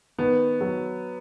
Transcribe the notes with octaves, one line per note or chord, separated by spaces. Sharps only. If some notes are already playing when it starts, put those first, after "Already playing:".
D#3 B3
F#3